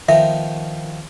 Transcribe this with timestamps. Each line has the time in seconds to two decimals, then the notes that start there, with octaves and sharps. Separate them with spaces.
0.09 D#3 F3 B3 E5